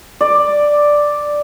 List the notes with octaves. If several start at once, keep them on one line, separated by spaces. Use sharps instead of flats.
D5